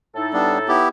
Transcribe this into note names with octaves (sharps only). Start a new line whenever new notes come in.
A2 D#4 A4
G3 B3 D4
B3 E4 G4